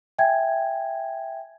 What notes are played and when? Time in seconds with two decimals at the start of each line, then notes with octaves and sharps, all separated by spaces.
0.19 E5 G5 G#5 G#6